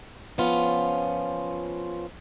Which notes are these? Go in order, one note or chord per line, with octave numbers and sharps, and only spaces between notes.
F3 B3 C#4 F4